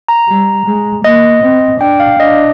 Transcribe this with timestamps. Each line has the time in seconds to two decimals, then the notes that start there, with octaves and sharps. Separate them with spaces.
0.08 A#5
0.28 G3
0.66 G#3
1.04 A#3 D#5
1.42 C4
1.80 D4 G5
2.00 F5
2.19 D4 D#5